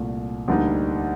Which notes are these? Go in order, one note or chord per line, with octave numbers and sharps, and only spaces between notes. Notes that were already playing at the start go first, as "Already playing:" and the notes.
Already playing: C2 A#2 A3
D2 D3 G3 A#3 D#4